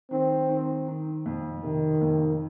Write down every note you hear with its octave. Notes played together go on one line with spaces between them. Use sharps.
D#3 C4
D#3
D#3
F2
C3 D#3
F2